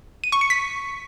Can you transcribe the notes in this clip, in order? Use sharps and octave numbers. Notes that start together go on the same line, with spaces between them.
D#7
C#6
C#7
B6